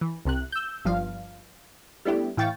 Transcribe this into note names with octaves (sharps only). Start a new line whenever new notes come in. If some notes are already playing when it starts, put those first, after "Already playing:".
E3
C2 C3 F#6
E6 G6
G1 G2 F3 F5
G3 A3 B3 D4 E4 G4
A2 E3 F5 G5 C#6 A6